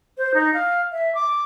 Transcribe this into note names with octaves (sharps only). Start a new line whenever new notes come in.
C5
D#4
F5
E5
D6